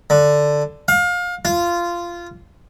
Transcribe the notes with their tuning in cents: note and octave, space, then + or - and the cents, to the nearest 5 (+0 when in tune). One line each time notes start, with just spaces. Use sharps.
D3 +5
F5 +30
F4 -15